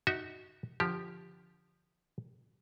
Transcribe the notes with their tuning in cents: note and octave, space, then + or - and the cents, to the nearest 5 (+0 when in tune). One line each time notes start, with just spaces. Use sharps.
D#4 -10 F#4 +0 E5 -30
D3 +0 F3 +0 G4 +0